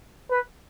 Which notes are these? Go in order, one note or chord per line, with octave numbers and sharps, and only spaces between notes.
B4